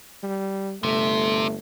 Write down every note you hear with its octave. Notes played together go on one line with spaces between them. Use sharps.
G3
G1 C3 A3